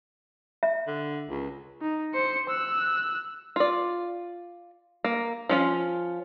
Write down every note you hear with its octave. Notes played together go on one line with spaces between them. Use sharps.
E5
D3
C#2
D#4
C5 C#7
E6 F#6
F4 D5
A#3
F3 C#4 F4